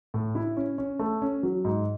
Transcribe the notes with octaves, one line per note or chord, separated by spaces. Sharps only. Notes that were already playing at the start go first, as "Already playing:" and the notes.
A2
E4
C#4
C#4
A3
C#4
F#3
G#2